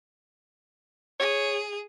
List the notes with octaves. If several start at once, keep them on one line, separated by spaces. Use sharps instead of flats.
G#4 C#5